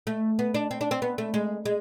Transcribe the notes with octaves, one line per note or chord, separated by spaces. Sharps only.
A3
B3
D4
C4
D4
C4
B3
A3
G#3
G#3